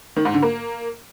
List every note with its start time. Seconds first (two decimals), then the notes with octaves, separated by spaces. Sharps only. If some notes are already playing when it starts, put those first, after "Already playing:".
0.16 D#3
0.25 G#2
0.34 D3
0.43 A#3